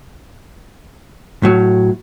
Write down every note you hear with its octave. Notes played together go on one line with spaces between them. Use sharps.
A2 F#3